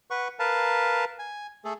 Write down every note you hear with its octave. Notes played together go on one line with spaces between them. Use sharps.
B4 F#5 C#6
A#4 B4 F5 A5
G#5
A3 G#4 A4